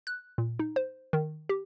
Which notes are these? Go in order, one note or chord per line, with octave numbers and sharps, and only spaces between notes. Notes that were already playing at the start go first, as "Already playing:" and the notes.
F#6
A#2
D#4
C5
D#3
G4